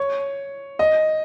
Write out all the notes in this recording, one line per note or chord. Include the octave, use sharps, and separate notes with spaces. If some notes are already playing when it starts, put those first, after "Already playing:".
Already playing: C#5
D#5